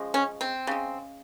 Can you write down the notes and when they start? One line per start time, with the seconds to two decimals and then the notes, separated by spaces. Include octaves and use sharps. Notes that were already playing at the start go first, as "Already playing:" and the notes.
Already playing: C#3 F3 G#3
0.14 C#4
0.41 C4
0.67 C#3 G#3